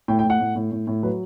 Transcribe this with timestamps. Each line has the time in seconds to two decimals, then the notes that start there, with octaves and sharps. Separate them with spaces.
0.08 A2 G5
0.19 G5
0.24 A2
0.30 F#5
0.40 A2
0.56 A2
0.72 A2
0.87 A2
1.03 F#3 B4